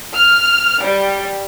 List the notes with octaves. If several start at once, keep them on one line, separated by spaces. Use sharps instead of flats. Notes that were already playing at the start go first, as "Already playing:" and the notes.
F6
G3